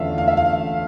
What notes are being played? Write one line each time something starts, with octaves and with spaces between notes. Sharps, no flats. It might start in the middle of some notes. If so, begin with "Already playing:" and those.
Already playing: E2 D3 A3 C#4 F4 E5 F5
F5
E5
F5